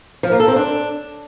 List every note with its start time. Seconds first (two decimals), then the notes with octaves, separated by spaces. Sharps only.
0.23 F3
0.31 A#3
0.40 A4
0.48 C4
0.56 D4